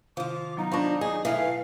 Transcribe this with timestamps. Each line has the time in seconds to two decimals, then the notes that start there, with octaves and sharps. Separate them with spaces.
0.17 C3 D#3 F3 F4 D6
0.57 F#3 B3 D#4 A#5
0.72 F3 D4 B5 C#6 A#6
1.01 G#4 D#5 D#6
1.25 B2 E3 A3 D#4 F5
1.42 B4